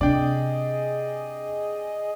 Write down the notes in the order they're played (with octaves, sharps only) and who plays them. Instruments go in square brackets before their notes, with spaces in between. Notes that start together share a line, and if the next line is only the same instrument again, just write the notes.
[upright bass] C3 [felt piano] D4 [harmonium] G#4 D#5 [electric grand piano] D5 G5